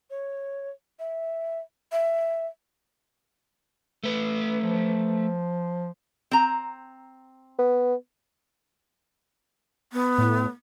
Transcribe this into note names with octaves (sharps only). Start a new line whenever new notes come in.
C#5
E5
E5
A3 B4
F3
C4 A#5
B3
B3
A2